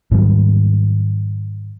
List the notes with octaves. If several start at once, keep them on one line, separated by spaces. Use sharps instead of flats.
G#2 D#3 F#3 G3